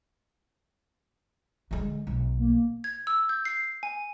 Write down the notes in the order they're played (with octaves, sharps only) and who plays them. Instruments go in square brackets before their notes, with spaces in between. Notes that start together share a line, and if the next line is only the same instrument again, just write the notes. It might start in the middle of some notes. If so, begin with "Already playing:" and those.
[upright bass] D3 G#3
B1
[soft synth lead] A#3
[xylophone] G#6
E6
G6
C7
G#5